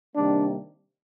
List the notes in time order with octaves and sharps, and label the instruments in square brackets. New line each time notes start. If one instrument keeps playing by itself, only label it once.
[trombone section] C3 D#3 G3 A#3 D4